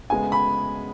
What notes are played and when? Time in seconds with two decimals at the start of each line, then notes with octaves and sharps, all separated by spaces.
0.10 D2 C#3 G#3 B3 G#5
0.32 B5